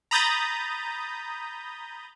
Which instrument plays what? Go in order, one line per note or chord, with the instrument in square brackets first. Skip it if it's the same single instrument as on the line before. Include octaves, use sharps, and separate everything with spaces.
[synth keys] A#5 B5 D#6 G6 A6